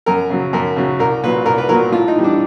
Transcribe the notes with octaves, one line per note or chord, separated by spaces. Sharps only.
F#2 A#4
C#3 F#3
F#2 A#4
C#3 F#3
C2 A#4
A#2 F#3 B4
C2 A#4
B4
A#2 F#3 A#4
A2 F4
D#4
E3 G3
D4